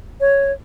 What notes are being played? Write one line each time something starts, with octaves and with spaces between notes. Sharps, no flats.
C#5